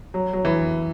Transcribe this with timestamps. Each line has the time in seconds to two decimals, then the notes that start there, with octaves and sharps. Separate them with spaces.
0.14 F#3
0.33 F#3
0.45 E3